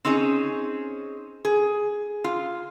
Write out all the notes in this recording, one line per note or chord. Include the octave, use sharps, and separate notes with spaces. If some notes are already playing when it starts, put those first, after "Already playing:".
C4 C#4 D#4 G#4 C#5
G#4
F4